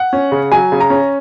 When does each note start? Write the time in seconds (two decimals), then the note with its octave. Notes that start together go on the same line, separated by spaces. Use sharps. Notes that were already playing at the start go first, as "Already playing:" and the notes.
Already playing: F#5
0.13 C#4
0.32 C#3
0.52 F#3 G#5
0.72 C#3
0.80 A#5
0.90 C#4